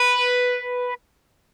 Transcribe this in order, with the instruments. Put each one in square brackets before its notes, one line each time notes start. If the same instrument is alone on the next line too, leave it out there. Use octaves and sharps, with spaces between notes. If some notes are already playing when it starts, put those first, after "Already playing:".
Already playing: [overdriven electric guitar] B4